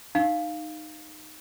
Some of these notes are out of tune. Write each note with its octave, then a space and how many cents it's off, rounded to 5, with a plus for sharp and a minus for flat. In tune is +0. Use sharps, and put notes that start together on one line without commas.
D#4 -10 F5 +0